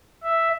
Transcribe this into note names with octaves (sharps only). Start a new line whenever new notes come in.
E5